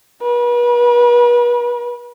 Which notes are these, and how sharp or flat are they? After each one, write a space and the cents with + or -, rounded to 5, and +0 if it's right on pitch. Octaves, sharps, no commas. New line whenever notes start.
B4 -40